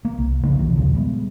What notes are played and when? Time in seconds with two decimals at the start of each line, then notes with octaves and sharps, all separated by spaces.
0.05 A#3
0.18 C2
0.43 C#3 F3 A#3 D4
0.59 B1 C3 D#3 E3
0.76 D#2 A#2 C#3 F3
0.95 G3 G#3 B3